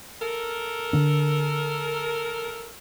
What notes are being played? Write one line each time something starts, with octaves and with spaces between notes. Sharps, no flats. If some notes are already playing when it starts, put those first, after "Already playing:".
A4 A#4
D3 D4